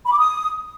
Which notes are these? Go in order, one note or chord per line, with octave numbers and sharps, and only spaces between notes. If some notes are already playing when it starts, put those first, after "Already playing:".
B5
D6
D#6